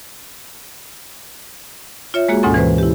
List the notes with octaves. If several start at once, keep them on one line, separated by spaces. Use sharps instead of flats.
F4 C#5 E5
G#3 A#3 F#4 G#4
D2 G#2 B2 C#4 A4 G#5
E3 B4 C5
E4 G4